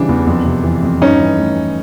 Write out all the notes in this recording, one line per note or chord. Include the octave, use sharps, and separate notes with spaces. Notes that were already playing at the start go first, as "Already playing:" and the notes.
Already playing: C#3 E3 G3 D4
E2
F2
C3
E3
F2
G2 C#4 D#4
E3
A3